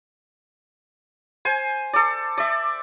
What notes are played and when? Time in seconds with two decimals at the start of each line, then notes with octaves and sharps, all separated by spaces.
1.45 C5 G#5
1.93 A4 D5
2.38 D5 E5